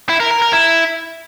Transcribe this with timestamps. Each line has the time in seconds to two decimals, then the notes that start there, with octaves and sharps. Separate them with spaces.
0.09 E4
0.20 A#4
0.31 A#4
0.42 A#4
0.53 E4